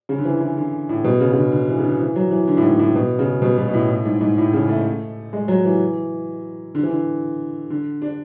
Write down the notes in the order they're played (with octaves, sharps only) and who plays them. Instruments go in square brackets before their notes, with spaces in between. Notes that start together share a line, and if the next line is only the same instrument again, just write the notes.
[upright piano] C#3
D3
E3
E3
D3
A2
B2
C#3
C#3
D3
D3
E3
C#3
D3
E3
F#3
E3
D3
A2
G#2
A2
B2
C#3
B2
B2
B2
A2
A2
G#2
G#2
A2
C#3
A3
G#3
F#3
E3
D3
E3
D3
D3
D4